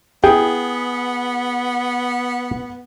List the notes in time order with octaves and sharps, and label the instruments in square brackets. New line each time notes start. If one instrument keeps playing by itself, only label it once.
[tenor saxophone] B3 [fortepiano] E4 G#4 [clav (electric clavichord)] G5